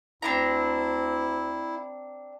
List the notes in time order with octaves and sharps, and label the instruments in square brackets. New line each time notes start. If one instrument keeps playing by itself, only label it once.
[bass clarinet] D2 [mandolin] C4 D4 A#5 [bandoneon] E4